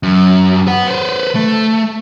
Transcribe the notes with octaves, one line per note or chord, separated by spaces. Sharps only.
F#2
B4 F#5
B4 C5
A3